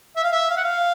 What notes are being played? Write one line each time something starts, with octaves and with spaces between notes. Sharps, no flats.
E5
F5
E5
F5
F#5
F5